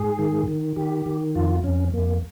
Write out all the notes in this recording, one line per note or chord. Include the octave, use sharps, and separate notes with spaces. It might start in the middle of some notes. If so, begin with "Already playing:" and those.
Already playing: G#2 G#4
D#3
D#3
D#3 G4
D#3
F2 F4
F2 C#4
F2 A#3